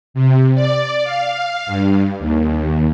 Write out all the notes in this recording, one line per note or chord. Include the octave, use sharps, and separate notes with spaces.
C3
D5
F5
G2
D#2